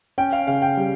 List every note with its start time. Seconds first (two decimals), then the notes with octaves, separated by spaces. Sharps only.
0.18 C#4 G5
0.32 F5
0.47 C#3 F5
0.62 G5
0.77 G3